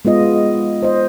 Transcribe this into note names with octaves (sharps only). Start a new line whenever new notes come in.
G#3 B3 F4 D#5
C5 D#5